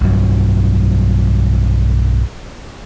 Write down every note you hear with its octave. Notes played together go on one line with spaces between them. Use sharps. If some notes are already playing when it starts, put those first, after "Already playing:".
B1 G2 F#3